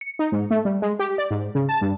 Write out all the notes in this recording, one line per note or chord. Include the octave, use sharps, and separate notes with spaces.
C#7
D#4
G#2
A3
G3
G#3
G4
D5
G#2
C#3
A5
G2